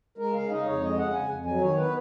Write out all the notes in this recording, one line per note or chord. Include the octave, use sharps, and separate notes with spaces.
G#3 A#4
C#3 F5
D#4 D#5
F2 C#5
G#3 D#5
C#3 F#5
F2 G#5
F2
F#3 G#5
D#3 C#5
B3 B4